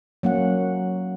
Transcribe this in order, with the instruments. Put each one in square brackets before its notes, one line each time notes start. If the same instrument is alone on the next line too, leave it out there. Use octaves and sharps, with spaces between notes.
[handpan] F#3 A#3 C#4 F#5